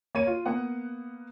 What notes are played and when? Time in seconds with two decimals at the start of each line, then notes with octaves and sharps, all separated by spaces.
0.15 A#3 C#5 D#7
0.27 F4
0.46 A#3 B3 F#5